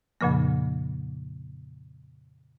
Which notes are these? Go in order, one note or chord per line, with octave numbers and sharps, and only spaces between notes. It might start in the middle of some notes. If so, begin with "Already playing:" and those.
F2 A#2 C#3 F3 A#3